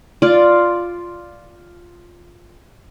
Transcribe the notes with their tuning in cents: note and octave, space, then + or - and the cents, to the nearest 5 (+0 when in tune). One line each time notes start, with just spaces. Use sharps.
F4 +0 D5 +0